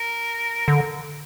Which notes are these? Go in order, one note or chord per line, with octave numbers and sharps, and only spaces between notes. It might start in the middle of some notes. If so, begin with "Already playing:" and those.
Already playing: A#4
D3